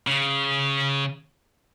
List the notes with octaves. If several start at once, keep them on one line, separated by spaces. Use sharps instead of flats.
C#3